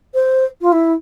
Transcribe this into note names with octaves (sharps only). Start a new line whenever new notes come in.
C5
F4
E4